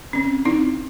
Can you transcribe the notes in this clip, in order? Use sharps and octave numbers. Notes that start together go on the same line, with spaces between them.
C4 C#4
C4 D#4 E4